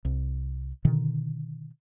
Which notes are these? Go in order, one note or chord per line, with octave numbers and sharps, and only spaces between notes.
C2
B2 D3 D#3